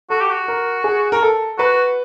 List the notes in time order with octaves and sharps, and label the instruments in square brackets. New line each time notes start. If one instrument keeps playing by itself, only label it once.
[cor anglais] F#4 [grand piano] A4
[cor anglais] G4
F#4
[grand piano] A#4
G#4
A#4
A4
[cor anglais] F#4 [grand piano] B4